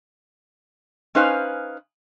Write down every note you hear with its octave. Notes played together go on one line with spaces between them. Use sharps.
C#4 D#4 B4 C5 F5 G#5